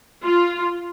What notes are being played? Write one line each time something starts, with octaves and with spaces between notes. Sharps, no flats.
F4